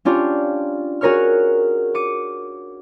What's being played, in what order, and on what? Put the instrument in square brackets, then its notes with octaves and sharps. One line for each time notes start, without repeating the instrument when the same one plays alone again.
[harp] C#4 D4 F4 G4
F#4 G#4 A#4 C#5 C#6 F6
D6 C#7 D#7